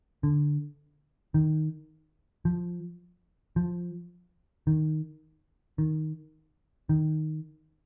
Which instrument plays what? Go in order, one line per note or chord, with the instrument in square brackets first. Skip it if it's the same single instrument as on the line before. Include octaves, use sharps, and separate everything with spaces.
[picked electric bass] D3
D#3
F3
F3
D#3
D#3
D#3